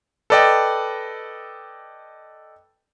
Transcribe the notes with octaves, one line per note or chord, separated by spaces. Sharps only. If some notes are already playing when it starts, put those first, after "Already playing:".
A4 B4 D5 D#5 G5